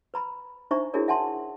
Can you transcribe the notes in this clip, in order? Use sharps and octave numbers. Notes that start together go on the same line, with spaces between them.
B4 A#5 B5
D4 D#4 C5 E5 A#5 C#6
D4 E4 F#4 G#4 A#4 C#5
E5 F#5 G#5 A5 C6